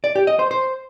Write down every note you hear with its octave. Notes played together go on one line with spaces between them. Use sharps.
D5
G4
D#5
C5
C5